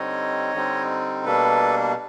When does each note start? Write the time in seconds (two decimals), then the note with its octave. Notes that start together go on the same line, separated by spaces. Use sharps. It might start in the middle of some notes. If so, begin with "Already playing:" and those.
Already playing: D3 G3 C4 D#4 C#5 D#5
0.54 D3 G3 C4 D#4
1.25 B2 G3 A#3 D4 A4 B4